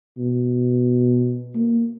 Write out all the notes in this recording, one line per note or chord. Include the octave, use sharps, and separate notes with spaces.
B2
A#3